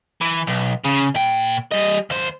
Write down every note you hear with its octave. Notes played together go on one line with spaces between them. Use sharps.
E3
B1
C#3
A#2 G5
G3 D#5
D#2 C5